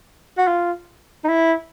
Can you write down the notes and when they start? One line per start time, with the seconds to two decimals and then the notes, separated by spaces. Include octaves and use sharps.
0.38 F#4
0.47 F4
1.24 D#4
1.28 E4